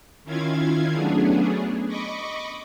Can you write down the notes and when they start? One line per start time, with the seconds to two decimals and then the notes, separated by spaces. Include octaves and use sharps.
0.24 D#3 C#4 E4 F4 F5 G#6
0.93 F#3 A3 B3 C#4 D4 G#4
1.88 D#5 B5 C#6 D6